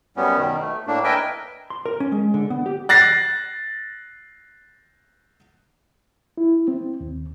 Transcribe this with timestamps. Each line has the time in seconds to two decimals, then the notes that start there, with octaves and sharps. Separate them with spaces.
0.17 F#2 G3 B3 C#4
0.37 B2 D#3
0.61 A3
0.87 A2 A#3 D4
1.04 A#4 B4 D#5 E5 G5 G#5
1.70 C6
1.86 A#4
2.00 C#4
2.12 G#3
2.34 D3
2.50 B3
2.66 G4
2.89 F#6 A6 A#6 C7
6.38 E4
6.68 C4
7.01 D#2